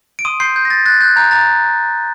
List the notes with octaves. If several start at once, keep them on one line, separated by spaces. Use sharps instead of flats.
D7
C6 D#6 D#7
C6 G6 C7
G6
A#6
G6 A6
F#6 A6
F#6 G6
A#5 G6
A#5 A6